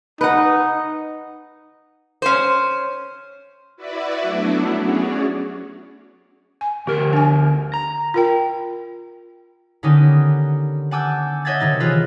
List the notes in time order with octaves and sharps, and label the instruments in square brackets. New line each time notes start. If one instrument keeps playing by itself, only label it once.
[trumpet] D#4 [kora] B4 F#5
[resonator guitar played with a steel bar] C#4 C5
[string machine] E4 F#4 B4 D5 E5
F#3 A3 B3 D4 E4
C#4 F#4 G#4 C#5 D5
[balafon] G#5
[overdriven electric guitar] D2 A#4 [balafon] G4
[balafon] D4 G#5
[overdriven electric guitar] A#5
[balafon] F4 A#4 G5
[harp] D3 D#3 B3 C#4 D#4 G4
F#5 G#5 A5 D6 E6 G6
C#5 D#5 E5 F#5 G#6 A6
C3 D#3 D#4 A6
C#3 E3 F4 B4